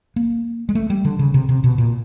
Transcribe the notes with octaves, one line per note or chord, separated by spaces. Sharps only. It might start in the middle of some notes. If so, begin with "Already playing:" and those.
A#3
G#3
A3
G3
D3
C#3
C3
C3
B2
A#2